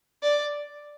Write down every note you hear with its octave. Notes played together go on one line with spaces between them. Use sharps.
D5